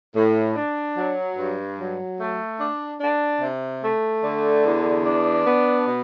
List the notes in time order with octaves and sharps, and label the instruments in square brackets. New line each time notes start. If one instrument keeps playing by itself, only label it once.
[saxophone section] A2
D4
F#3
G2
F#3
A3
D4
D4
C3
A3
D3
E2
D4
B3
B2